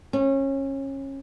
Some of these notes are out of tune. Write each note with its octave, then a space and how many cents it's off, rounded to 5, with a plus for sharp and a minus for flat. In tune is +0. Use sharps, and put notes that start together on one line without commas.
C#4 -25